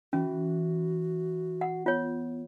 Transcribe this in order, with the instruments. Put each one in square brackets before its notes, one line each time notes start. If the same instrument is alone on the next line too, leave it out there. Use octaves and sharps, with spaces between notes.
[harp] E3 [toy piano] C#4 [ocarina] F#4
[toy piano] F#5
[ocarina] B3 [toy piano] F4 C#5